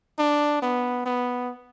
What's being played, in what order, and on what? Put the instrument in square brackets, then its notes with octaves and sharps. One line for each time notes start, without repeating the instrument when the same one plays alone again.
[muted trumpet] D4
B3
B3